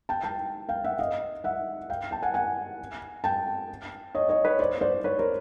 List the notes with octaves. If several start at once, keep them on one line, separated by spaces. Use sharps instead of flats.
G5 A5
G5 A5
F5 G5
E5 F#5
D#5 F5
E5 F#5
F5 G5
G5 A5
F#5 G#5
F#5 G#5
G5 A5
C#5 D#5
C#5 D#5
B4 C#5
C5 D5
C5 D5
B4 C#5
A#4 C5